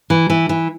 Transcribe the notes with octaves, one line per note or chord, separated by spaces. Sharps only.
E3
E3
E3